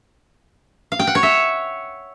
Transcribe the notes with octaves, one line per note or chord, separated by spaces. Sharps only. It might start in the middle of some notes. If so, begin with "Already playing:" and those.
F5
G5
F#5
C#5
E5